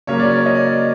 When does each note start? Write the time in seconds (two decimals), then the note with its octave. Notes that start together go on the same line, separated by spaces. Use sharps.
0.07 C#3 F#3 A#3 C#5
0.19 D5
0.31 C#5
0.46 D#5
0.55 D5